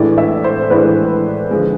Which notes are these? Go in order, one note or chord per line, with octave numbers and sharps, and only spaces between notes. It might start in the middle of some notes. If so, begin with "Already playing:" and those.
Already playing: A2 E3 G#3 D4 D5
E5
C5
A2 E3 G#3 D4 B4
D3 F3 G#3